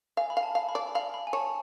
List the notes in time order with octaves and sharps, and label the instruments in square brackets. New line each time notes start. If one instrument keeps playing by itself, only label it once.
[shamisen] F5 [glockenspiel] G#5
[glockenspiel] B5
[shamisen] F5
[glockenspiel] A5
[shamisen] F5
[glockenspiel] B5
[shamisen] D5
[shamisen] F5 [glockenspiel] B5
[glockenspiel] B5
G#5
[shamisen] C#5 [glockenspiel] A5